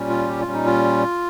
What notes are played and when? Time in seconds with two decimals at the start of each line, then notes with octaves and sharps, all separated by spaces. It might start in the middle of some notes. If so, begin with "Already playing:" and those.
Already playing: A#2 G3 C#4
0.09 F4
0.28 G4
0.40 F4
0.47 A#2 G3 C#4
0.53 D#4
0.66 F4